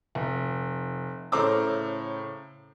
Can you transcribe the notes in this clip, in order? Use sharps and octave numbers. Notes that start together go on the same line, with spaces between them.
F1
A2 C#3 C5 A#5 D6 E6